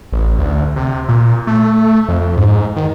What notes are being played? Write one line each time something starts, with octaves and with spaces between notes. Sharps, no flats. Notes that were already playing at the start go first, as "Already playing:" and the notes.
A1
D2
C3
A#2
A3
F2
G#2
D#3